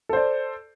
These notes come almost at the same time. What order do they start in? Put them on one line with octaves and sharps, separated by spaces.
A4 C5 D5